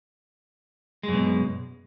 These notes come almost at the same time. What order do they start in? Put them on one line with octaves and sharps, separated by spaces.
G#3 F#2 B2